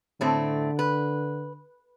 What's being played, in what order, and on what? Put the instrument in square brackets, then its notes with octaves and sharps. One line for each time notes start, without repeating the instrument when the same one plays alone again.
[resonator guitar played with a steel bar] A2 A3 C4 [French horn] D3
[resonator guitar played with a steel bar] B4